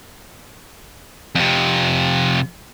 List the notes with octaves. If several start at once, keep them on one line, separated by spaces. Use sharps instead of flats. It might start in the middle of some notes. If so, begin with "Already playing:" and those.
F2 C3